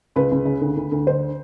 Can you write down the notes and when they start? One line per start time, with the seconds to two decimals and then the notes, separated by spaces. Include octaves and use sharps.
0.16 C#2 B4
0.31 C#2
0.45 C#3
0.61 D2
0.77 D2
0.92 D2
1.07 D3 C5